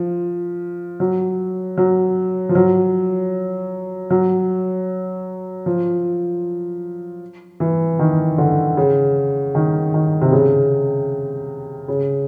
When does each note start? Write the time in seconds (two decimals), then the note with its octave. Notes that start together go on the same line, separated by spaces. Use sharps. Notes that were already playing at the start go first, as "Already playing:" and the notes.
Already playing: F3
1.00 F#3
1.77 F#3
2.49 F3
2.55 F#3
4.10 F#3
5.66 F3
7.60 E3
7.99 D#3
8.38 D3
8.77 C#3
9.55 D#3
9.94 D#3
10.21 C3
10.32 C#3
11.88 C#3